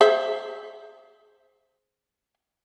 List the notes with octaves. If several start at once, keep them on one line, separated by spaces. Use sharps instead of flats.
G#4 C5 E5